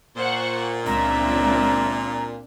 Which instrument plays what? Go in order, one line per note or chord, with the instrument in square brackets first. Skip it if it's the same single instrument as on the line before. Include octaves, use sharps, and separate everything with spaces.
[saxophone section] A#2 [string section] C5 F#5 C#6
[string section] C#2 E5 [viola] C4 D4 [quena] A#5